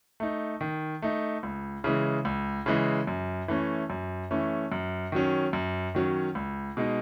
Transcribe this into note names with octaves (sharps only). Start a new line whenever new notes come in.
A3 D#4
D#3
A3 D#4
C#2
C#3 E3 G#3
C#2
C#3 E3 G#3
F#2
E3 A3 C#4
F#2
E3 A3 C#4
F#2
D#3 F#3 C#4
F#2
D#3 F#3 C#4
C#2
B2 G#3 D#4